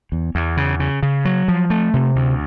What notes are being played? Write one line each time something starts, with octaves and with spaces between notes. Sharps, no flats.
E2
E2
C#3
C#3
C#3
F#3
F3
A3
C3
D2